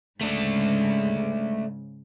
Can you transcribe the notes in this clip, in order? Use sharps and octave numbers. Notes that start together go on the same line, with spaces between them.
G#2 C#3 G#3 A3 D4